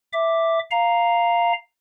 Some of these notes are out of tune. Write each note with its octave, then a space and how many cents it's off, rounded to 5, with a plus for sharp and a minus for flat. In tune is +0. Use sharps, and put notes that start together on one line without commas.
E5 +0 D6 +0
F5 +0 A#5 +0